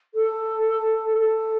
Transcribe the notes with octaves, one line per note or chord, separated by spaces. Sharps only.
A4
A4